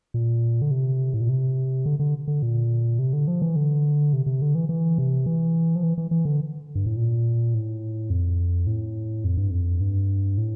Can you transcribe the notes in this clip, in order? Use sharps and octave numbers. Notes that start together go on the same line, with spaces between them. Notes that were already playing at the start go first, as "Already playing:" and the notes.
A#2
D3
C3
A2
A#2
C3
D3
D3
D3
A#2
C3
D3
F3
E3
D3
C3
C3
D3
E3
E3
C3
E3
F3
E3
E3
E3
D3
G2
A2
A#2
A2
F2
A2
F2
G2
F2
G2
A2